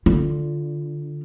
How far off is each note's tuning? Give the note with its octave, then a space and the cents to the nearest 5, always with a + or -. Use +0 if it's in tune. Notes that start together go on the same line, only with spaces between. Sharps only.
D3 +0 F4 +0